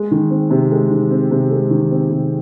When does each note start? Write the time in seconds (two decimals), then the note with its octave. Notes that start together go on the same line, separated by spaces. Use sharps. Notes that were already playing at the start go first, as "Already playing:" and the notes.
Already playing: G#3
0.11 D#3
0.30 C4
0.50 C3
0.71 G#3
0.90 D#3
1.11 C4
1.31 C3
1.51 G#3
1.70 D#3
1.91 C4
2.10 C3